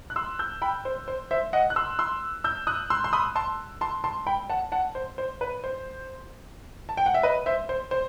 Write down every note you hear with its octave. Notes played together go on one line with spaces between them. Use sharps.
F#6
C6 E6
E6 G6
G5 B5
C5
C5
C5 E5
D#5 F#5
F#6
C6 E6
C6 E6
E6 G6
D#6 F#6
C6 E6
C6
B5 D#6
A5 C6
A5 C6
A5 C6
G5 B5
F#5 A5
F#5 A5
C5
C5
B4
C5
A5
G5
F#5
E5
B4 D#5
C5 E5
C5
C5